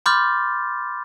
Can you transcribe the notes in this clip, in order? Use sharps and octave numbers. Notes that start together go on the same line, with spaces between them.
B5 C6 D6 F6 G6 A6